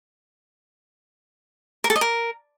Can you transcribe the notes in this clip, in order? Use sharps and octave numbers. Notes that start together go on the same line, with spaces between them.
A#4
A4
D#5
A#4